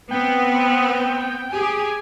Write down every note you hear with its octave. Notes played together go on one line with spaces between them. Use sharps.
B3 C4 G5
G4 G#4 G#5